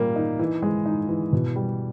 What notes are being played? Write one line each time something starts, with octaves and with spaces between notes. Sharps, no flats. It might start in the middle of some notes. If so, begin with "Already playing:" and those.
Already playing: A#2 G3 A#3
D#4
E3
G#3
D#4
E3
B2
G3